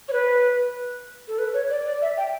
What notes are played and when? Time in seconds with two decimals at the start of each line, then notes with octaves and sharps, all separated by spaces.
0.09 C#5
0.13 B4
1.28 A4
1.38 B4
1.54 C#5
1.70 D5
1.86 D5
2.02 E5
2.18 G5